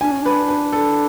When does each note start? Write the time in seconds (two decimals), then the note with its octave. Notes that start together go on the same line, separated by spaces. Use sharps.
0.01 D4 G#5
0.12 C#4
0.22 D4 B4
0.49 B4
0.73 A4